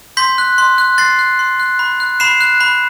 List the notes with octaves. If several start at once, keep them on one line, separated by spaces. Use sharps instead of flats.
C6 G6 B6
F#6
C6
F#6
C6 A6 C7
F#6
C6
F#6
B5
F#6
B5 C7 E7
F#6
B5